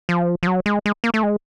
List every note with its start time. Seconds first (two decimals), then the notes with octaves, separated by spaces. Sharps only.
0.09 F3
0.43 F3
0.47 F#3
0.66 G#3
0.86 G#3
1.04 A#3
1.14 A3
1.23 G#3